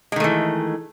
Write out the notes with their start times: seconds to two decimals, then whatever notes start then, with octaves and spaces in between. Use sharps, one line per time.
0.12 G#3
0.16 D#3
0.20 A3
0.24 E3